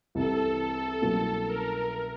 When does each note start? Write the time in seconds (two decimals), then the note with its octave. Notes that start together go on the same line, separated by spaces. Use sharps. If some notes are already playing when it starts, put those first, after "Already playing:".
0.15 C2 C3 E3 A4
1.02 C2 B2 F#3 A#3 C#4
1.46 A#4